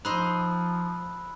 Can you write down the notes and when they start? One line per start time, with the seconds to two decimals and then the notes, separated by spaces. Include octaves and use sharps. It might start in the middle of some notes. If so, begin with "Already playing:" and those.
0.05 F3 D#4 C5 D#5 B5 E6 F#6